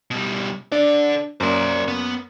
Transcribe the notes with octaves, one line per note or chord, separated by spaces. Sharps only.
B2 G3
D4 A4 D5
F#2 A#3 C5 D5
B3